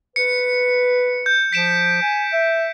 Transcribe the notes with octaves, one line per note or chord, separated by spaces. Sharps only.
B4 C#7
G6
F3 B6 D7 E7
G#5
E5